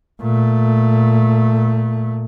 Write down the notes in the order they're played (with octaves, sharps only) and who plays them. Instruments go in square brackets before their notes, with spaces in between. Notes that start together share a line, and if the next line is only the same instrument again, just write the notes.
[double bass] A#2 A3